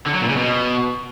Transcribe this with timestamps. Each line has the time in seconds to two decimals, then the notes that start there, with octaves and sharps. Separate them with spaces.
0.07 D3
0.14 F#3
0.21 A#2
0.29 C#3
0.36 B2